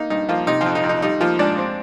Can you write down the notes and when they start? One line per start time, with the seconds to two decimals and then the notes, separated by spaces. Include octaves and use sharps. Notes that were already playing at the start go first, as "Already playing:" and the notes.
Already playing: A#3 D#4
0.10 G2 D#4
0.29 F3 A#3 F4
0.47 C3 D#4
0.61 F3 F4
0.66 F2
0.75 D#4
0.84 F2
0.89 D#4
1.02 G3 D#4
1.20 F3 A#3 F4
1.39 G#2 D4 D5
1.58 C4